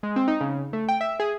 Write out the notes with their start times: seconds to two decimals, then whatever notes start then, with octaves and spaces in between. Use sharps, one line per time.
0.03 G#3
0.16 C4
0.28 D#4
0.41 C#3
0.73 A3
0.89 G5
1.01 E5
1.20 G#4